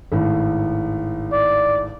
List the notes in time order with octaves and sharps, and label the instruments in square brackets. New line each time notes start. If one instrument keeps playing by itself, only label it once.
[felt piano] G#1 A2
[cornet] D5